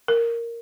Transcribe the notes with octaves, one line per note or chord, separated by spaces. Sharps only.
A#4